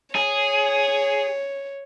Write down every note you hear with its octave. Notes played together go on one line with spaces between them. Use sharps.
G#4 C#5